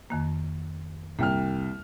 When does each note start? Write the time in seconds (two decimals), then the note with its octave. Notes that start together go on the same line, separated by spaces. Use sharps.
0.10 F2 D#3 A#3
1.19 C2 A#3 G5 F6